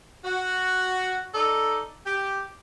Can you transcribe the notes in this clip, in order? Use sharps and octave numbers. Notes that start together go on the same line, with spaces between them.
F#4
D#4 A4 D5
G4